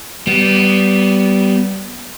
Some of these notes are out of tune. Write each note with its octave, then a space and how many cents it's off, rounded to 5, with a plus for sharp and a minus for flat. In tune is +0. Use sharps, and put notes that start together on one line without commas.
G3 -25 B3 +0